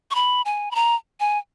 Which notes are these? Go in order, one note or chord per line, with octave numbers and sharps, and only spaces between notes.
C#6
B5
G#5
B5
A#5
G#5